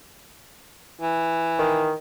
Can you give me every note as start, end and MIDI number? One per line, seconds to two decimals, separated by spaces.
1.01 1.92 52
1.59 1.93 51